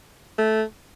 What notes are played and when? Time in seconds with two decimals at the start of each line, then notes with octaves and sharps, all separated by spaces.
0.38 A3